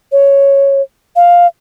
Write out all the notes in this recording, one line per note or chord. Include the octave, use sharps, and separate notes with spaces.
C#5
F5